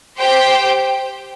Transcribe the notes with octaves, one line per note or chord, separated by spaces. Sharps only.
G4 C5 G5